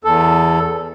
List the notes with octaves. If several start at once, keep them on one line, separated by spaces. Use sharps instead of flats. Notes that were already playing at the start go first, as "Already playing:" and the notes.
E2 A4